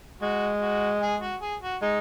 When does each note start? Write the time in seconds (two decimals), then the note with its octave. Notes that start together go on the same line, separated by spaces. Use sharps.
0.21 G#3 F#4
0.61 F#4
1.02 G#4
1.21 F#4
1.41 G#4
1.62 F#4
1.82 G#3 D#4